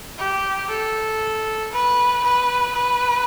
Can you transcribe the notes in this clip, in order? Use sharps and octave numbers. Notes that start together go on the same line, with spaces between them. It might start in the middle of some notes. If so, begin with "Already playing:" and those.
G4
A4
B4
B4
B4